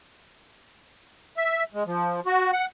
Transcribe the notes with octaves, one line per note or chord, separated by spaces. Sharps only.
E5
G#3
F3
F#4
F#5